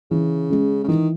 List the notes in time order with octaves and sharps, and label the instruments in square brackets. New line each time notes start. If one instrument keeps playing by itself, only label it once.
[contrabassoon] C#3 [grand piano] E3
[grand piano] G#3 C#4
[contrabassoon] C#3
[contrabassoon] D#3 [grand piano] E3